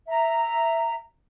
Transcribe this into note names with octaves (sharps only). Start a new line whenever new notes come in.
E5 A#5